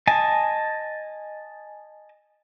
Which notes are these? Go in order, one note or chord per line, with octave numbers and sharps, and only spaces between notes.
D#5 G#5 A5